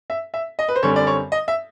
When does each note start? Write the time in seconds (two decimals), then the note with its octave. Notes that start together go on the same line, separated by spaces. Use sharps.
0.10 E5
0.34 E5
0.59 D#5
0.68 B4
0.75 C5
0.83 F#2 D3 G3 C4 C#5
0.96 D5
1.07 C#5
1.32 D#5
1.48 E5